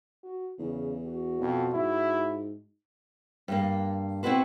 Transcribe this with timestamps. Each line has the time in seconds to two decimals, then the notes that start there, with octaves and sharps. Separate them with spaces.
0.24 F#4
0.59 E2 C#3
1.06 F#4
1.41 F2 B2
1.74 G#2 E4
3.48 G2 A#3
4.23 B3 C4 E4 F#4 B4 C5